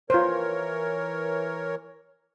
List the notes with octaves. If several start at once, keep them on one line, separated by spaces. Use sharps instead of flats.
E3 F4 A#4 C5 C#5